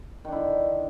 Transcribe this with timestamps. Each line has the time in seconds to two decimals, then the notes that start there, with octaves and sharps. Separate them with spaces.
0.25 D#3
0.28 D4
0.32 E4
0.36 D3